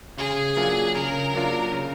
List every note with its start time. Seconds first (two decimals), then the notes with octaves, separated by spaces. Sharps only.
0.17 C#3 G#4
0.57 F#3 A#3 D4 F4
0.95 C#3 A#4
1.33 F#3 A#3 D4 F4
1.72 C#3